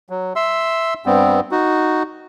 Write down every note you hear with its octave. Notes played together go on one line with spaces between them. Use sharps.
F#3
E5 C6 E6
G2 G3 B3 C4
D#4 F#4